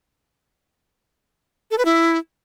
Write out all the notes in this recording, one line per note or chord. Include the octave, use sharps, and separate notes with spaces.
A4
B4
E4